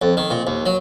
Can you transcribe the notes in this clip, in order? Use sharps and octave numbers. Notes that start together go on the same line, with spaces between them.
F2
D#3
A#2
D#2
F#3